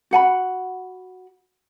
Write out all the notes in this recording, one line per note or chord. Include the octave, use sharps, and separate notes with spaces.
F#4 F#5 G#5 B5